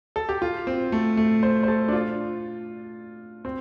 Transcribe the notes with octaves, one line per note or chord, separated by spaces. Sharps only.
A4
G4
F4
C4
A3
A3
C5
C5
A4
D4
F4
C4